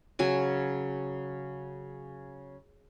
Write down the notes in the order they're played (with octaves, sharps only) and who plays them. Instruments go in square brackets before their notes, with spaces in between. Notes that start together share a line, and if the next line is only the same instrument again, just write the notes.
[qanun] C#3 F#3 G#5